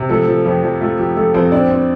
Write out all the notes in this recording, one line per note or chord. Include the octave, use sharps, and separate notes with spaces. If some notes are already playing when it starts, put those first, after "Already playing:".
Already playing: C3
F3 A3 A4
F3
F2 G4
F2
A3 F4
F3 G4
F3 A3 A4
F2 C4 C5
C4 D4 D5
C4